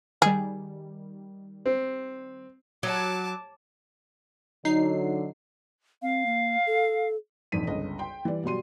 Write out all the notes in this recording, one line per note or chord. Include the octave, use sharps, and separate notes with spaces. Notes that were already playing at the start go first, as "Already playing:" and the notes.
D#3 G3 G#4
C4
F#3 A5 D6
D3 F#3 D#4 C7
C4 F5
A#3
A4
E1 A#1 F2 D#4 B6 D#7
G1 C#2 D#5
G5 C6
E3 G3 D5
B2 F#3 G3 C6 D#7